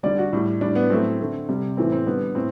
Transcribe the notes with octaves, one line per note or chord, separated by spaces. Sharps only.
D3 G3 D5
F#4
A2 G3
A2 G3 D4
B3
A2 F#3 A3 C4
D3 A3
C3 G3
A2 E3 A3 C4
C4
D3 G3 B3
A2 C4